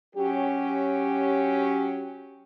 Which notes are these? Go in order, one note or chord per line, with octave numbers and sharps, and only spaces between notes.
F#3 C#4 G4